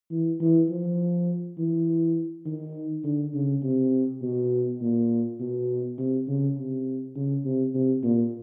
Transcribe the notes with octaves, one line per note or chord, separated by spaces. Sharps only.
E3
E3
F3
E3
D#3
D3
C#3
C3
B2
A#2
B2
C3
C#3
C3
C#3
C3
C3
A#2